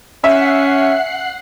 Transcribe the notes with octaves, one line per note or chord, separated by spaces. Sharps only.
C#4 E5 F#5 F#6 C7